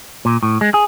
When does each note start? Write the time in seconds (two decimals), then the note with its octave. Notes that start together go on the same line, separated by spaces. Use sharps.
0.25 A#2
0.43 A2
0.61 G#3
0.74 G#4